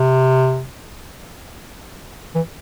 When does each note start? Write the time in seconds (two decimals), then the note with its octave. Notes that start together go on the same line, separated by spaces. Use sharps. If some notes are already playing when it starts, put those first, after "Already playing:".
Already playing: C3
2.35 E3